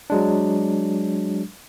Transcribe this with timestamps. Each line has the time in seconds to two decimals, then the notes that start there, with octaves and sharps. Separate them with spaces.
0.10 F#3 G#3 D4